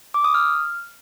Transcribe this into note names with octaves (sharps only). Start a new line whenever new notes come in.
D6
D#6
F6